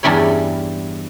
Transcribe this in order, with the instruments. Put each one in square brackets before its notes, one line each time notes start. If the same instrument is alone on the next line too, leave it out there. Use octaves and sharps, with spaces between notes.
[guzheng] E2 G2 G3 E4 C#5